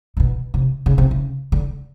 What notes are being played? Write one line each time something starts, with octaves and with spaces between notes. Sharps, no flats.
C3
B2
C3
C#3
C3
C#3
D3